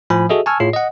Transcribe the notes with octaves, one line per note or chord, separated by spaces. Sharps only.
A2 F3 G#5 B5
F#4 G#4 A4 D#5 E5
G#5 A5 C#6 E6 F6 G#6
A2 F4 G#4 C#5 C7
D#5 F#5